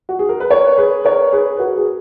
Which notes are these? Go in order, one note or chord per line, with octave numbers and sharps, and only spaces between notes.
F#4
G#4
A#4
B4
A#4 C#5
G#4 B4
A#4 C#5
G#4 B4
B4
F#4 A#4
G#4